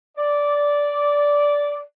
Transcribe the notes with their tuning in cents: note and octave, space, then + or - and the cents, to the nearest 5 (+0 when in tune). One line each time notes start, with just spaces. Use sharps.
D5 -10